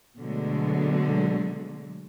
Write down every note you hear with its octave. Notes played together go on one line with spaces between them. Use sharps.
B2 D3 F#3 G#3 A3